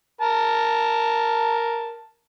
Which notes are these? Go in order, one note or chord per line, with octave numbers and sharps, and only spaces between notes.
A#4 A5